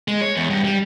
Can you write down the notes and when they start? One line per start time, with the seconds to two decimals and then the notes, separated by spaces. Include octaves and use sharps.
0.08 G#3
0.22 C#5
0.35 E2
0.50 G2
0.64 G3